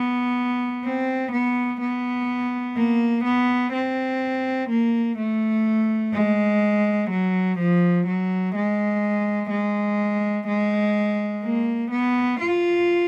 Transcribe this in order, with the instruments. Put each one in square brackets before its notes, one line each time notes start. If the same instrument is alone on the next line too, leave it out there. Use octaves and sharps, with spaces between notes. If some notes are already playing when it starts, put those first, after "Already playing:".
Already playing: [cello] B3
C4
B3
B3
A#3
B3
C4
A#3
A3
G#3
F#3
F3
F#3
G#3
G#3
G#3
A#3
B3
F4